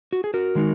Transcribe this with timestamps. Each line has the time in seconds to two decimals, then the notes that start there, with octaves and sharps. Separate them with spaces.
0.13 F#4
0.24 G#4
0.34 F#4 A#4
0.55 D#3 G#3 D#4